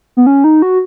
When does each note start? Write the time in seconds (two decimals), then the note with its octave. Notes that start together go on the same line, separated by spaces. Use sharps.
0.17 B3
0.26 C#4
0.44 D#4
0.62 F#4